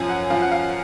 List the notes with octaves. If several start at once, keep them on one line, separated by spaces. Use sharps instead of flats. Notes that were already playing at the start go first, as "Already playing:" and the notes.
Already playing: F#2 F3 G#5
F#5
F#2 F3 F5
F#5
F5